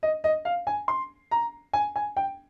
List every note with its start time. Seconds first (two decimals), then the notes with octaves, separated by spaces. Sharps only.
0.03 D#5
0.24 D#5
0.45 F5
0.67 G#5
0.88 C6
1.31 A#5
1.73 G#5
1.96 G#5
2.17 G5